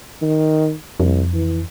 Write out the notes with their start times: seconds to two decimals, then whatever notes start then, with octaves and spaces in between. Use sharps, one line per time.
0.22 D#3
1.00 C2 F2
1.33 E3